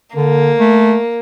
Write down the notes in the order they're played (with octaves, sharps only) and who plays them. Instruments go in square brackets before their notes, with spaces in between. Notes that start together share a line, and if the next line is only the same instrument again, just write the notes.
[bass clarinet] D3 [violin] A#3
[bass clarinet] A3